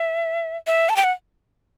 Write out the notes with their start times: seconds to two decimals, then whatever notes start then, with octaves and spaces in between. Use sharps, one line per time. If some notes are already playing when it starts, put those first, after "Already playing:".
Already playing: E5
0.67 E5
0.89 A5
0.96 G5
1.04 F#5